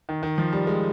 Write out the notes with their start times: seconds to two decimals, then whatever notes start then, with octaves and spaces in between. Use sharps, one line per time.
0.09 D#3
0.23 D#3
0.38 F3
0.53 G3
0.67 G#3